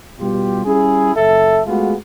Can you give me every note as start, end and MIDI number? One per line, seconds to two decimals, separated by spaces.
0.20 0.63 47
0.20 0.63 55
0.20 0.63 65
0.20 0.63 67
0.65 1.14 55
0.65 1.14 61
0.65 1.14 64
0.65 1.14 68
1.16 1.61 30
1.16 1.61 69
1.16 1.61 76
1.67 1.94 56
1.67 1.94 57
1.67 1.94 59
1.67 1.94 65
1.67 1.94 66
1.67 1.94 68